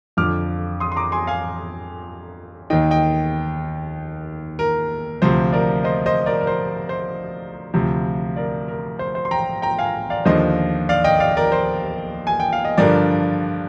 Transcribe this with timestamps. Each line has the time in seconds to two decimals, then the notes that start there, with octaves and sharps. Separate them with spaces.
0.17 F2 D3 F3 D6 F6
0.80 C6 D#6
0.92 C6
0.96 A#5 D6
1.12 G#5 C6
1.27 F5 G#5
2.70 D#2 D#3 D#5 G5
2.91 D#5 G5
4.59 A#4
5.22 D2 C3 F3 C5
5.53 A#4 D5
5.84 C5 D#5
6.06 C5 D#5
6.26 A#4 D5
6.41 A#4
6.47 C5
6.89 C5
7.74 D2 C3 F3
8.36 A#4 D5
8.68 A#4
8.99 C5
9.15 C5
9.25 C6
9.31 G5 A#5
9.62 G5 A#5
9.79 F5 G#5
10.10 D5 F5
10.25 D#2 D3 F3 C5 D#5
10.89 D5 F5
11.04 D#5 G5
11.20 D5 F5
11.37 A#4 D5
11.52 C5
12.27 G#5
12.40 G5
12.53 F5
12.65 D#5
12.78 G2 D3 F3 A#4 D5